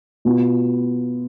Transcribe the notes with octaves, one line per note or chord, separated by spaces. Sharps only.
B2 B3 F4